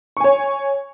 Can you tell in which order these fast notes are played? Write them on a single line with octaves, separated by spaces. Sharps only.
C#6 G#5 C#5